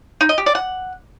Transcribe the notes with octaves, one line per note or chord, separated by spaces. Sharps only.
D#4
D#5
G4
D5
F#5